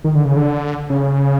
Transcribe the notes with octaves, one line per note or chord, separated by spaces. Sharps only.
D#3
D3
C#3
D3
C#3